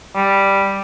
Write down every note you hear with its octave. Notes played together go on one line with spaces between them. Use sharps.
G3